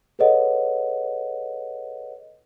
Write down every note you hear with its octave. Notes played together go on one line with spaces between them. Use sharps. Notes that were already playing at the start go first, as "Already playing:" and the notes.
G#4 A4 B4 C#5 D#5 F#5